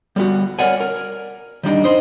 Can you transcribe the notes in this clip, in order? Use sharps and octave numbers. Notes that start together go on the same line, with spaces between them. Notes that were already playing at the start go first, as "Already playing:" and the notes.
G3 B3 F#4
A#4 C#5 D5 F#5 G#5
A#4
D#3 G3 D4 D#4
D#4 C5